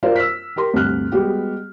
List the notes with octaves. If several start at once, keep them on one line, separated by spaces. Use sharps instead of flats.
F4 F#4 A#4 C5 D5 F5
E6 F6 B6
G4 A#4 A#5 C6
D2 G2 C3 F6 F#6
G3 G#3 B3 F#4 G4